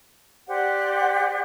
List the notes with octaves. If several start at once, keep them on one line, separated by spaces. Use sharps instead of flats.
G4 C5 D5 F#5